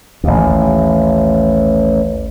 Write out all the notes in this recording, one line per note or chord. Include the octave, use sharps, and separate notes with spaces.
A1 D#2